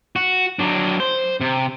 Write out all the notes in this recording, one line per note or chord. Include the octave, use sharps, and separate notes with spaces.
F#4
F#3 D4
C5
C3